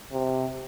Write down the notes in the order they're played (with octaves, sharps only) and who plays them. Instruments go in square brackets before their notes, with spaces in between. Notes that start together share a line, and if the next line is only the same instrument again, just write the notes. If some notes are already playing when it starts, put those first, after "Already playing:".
[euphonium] C3